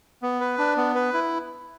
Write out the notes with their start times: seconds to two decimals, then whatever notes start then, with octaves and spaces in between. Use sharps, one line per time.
0.22 B3
0.40 B4
0.58 D4
0.77 B3
0.95 B4
1.14 E4